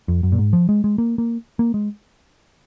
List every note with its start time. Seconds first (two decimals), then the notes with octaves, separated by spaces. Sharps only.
0.08 F2
0.23 F#2
0.32 A#2
0.38 G#2
0.53 F3
0.69 G#3
0.84 G#3
0.98 A#3
1.18 A#3
1.59 A#3
1.74 G#3